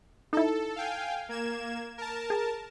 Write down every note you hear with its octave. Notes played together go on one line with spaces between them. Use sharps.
D#4 E4 A4
F5 G5 G#5
A#3 G#6 E7
A#4 A5
G#4